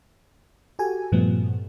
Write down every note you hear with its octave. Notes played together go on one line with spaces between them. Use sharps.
F#4 G4 A4 G#5
G2 A#2 F3 G3 A3 B3